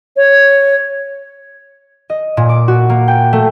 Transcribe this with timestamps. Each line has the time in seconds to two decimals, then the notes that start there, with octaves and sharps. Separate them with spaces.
0.16 C#5
2.10 D#5
2.37 A#2
2.49 D6
2.68 F#4
2.90 A#3
3.08 G5
3.33 A3